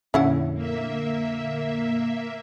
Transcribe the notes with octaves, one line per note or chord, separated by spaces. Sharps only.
F2 A#2 D3 C#4 E4 F#5
A#3 E5